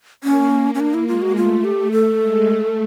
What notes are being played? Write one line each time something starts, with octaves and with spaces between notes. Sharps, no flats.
A#3 C#4
C#4
A#3 D4
E4
G#3 F4
F#4
A3 F4
A3 G4
A3 A4
G#3
A3